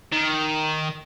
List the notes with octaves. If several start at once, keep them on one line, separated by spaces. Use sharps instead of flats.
D#3